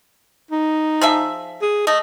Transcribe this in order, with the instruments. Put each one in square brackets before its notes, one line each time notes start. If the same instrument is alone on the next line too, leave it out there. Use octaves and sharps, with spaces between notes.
[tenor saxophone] D#4
[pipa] F3 G#4 E5
[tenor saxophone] G#4
[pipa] A3 [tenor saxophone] D#5